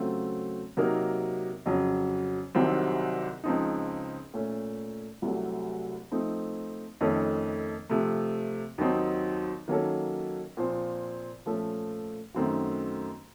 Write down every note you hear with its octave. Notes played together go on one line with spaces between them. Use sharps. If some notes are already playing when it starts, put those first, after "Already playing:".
Already playing: C#3 F#3 A3 C4 F4
C3 F#3 A#3 D#4 A#4
F2 C#3 F#3
C2 C3 D#3 F#3 C4
C#2 C#3 F3 C4 D#4
A#2 A3 C#4
C2 C3 F#3 A3
F3 A3 C4 D#4
F2 D#3 A3 C#4 A4
C3 F3 A3
D#2 D#3 F#3 C4 D#4
D#3 F#3 A#3 C#4 A4
A#2 F3 C4 F4 C5
A#2 F3 A3 C#4 A4
F#2 D#3 A3 C4 F#4